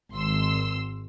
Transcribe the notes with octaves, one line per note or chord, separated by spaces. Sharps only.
G#1 C6 E6